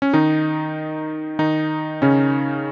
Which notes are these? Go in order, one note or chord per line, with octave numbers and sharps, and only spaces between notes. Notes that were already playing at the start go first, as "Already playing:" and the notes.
C#4
D#3 D#4
D#3 D#4
C#3 C#4